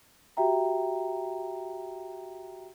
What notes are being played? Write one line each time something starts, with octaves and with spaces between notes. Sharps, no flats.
F#4 G4 E5 G5 A#5